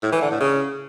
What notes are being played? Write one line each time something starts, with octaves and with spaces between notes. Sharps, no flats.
A2
E3
D3
A2
C#3